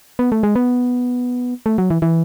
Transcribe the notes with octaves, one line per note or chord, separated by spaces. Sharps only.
B3
A3
G#3
B3
A3
F#3
E3
E3